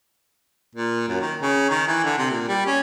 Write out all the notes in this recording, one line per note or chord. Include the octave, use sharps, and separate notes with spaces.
A#2
F#2
D#3
C#3
D#3
E3
D3
C3
A#2
G3
C#4